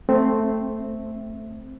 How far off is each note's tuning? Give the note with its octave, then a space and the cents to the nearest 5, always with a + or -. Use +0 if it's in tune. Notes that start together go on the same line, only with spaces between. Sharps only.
A3 +0 C4 +0 E5 +0